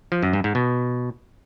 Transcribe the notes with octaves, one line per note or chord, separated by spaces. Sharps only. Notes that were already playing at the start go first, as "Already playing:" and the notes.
F3
F#2
G2
G#2
B2